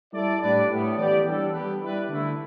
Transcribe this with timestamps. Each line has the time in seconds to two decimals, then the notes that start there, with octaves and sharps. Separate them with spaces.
0.13 G3 E4 A4 D5
0.41 A2 G3 D4 B4 D5
0.69 A2 G3 B3
0.97 E3 B3 G4 D5
1.25 E3 G3 D4 A4
1.53 G3 B3 G4 B4
1.81 G3 E4 B4 D5
2.09 D3 A3 E4